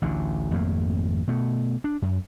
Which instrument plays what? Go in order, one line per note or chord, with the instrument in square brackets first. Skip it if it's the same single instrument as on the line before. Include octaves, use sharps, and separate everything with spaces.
[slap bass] A1 D2 D3
G#1 F2 A3 A#3
B2 A3
D4
F#2